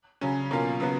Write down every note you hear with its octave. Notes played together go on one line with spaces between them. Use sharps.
C#3 F#3 C#4
B2 F#3 A#3 C#4 F4
C#3 F#3 B3 F#4